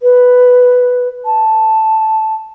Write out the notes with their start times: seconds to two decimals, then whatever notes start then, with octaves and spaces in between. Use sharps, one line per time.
0.02 B4
1.25 A5